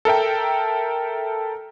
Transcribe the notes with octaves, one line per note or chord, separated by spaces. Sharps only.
A4 A#4 E5 G5